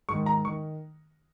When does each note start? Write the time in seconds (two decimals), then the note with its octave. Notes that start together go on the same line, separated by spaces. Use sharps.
0.09 G#2 D#3 C#6
0.26 A#5
0.45 D#3 C#6